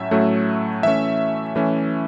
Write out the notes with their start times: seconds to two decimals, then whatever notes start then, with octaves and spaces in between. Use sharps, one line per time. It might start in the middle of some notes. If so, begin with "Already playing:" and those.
Already playing: A2 F#3 A3 C#4 E5
0.11 A2 F#3 A3 C#4
0.83 E3 A3 C#4 E5
1.56 E3 A3 C#4